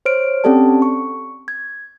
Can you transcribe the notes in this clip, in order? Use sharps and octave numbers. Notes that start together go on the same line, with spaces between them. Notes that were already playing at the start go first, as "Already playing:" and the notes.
C5 C#5 F6 D7
C4 C#4 G4 A4 D5 A5
C#6
G#6